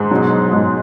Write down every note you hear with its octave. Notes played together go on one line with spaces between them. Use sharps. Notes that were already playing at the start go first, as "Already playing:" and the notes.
Already playing: G#2 G#3
B2 F#3
G#2 G#3